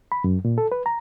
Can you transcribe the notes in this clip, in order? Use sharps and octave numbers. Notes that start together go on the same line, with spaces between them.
B5
F#2
A#2
A4
B4
A#5